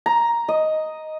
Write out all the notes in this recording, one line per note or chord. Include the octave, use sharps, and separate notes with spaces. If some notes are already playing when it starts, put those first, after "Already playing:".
A#5
D#5